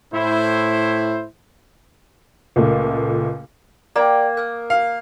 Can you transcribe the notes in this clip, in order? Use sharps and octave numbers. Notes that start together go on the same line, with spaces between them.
A2 E4 C5
C#2 A#2 A3
A#3 D5 G5
A#4 D#6 F#6
F5